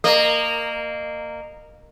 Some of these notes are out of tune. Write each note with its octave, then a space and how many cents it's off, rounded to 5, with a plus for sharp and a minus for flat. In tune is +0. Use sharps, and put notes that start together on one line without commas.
A#3 -15 D#5 -30